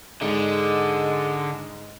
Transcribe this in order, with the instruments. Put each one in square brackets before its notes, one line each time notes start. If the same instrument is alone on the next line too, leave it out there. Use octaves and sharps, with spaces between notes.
[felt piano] G#2 [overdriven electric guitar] D3 [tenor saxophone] G#3